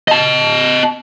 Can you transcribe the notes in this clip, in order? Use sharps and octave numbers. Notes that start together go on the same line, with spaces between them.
D#5 A5